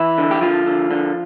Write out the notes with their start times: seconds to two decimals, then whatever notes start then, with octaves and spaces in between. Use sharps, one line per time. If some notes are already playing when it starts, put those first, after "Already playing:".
Already playing: E3 E4
0.18 D3
0.31 G4
0.41 D3 F3 F4
0.67 D3
0.91 D3